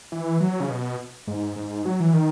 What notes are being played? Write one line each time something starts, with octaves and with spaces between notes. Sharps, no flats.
E3
F#3
C#3
B2
G#2
G#2
F#3
E3
D#3